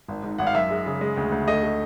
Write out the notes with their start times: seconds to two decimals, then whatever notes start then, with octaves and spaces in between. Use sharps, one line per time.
0.08 G#1
0.23 G#2
0.38 G#1 F#5
0.47 F5
0.54 F#2 E5
0.70 G#3
0.86 C#3
1.01 G#3
1.17 D2
1.32 D2
1.48 A3 D#5
1.63 A3